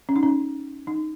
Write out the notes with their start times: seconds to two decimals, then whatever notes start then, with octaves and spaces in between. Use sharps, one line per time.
0.09 C#4
0.16 D#4
0.23 C#4
0.87 D#4